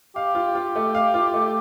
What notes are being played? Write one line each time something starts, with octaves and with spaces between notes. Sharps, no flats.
G4 F5
F4
F4
A3
F5
F4
A3